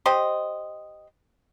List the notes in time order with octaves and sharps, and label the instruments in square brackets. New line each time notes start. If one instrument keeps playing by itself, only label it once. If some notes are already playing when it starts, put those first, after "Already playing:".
[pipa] G4 C5 D#5